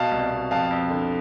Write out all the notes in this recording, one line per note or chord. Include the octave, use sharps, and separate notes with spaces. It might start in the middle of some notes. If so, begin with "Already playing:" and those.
Already playing: B2 F5 A5
C2
B2
F2 F5 A5
F2
D3